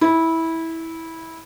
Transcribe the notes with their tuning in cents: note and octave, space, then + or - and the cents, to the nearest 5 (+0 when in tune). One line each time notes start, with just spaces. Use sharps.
E4 -15